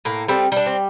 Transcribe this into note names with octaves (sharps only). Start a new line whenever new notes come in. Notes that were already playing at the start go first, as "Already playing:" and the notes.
A2 A#3
G3 A3 C4
G3 D4
C4